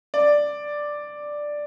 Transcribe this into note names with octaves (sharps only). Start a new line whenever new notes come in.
D5